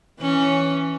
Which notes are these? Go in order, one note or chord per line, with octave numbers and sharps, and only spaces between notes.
E3 C#4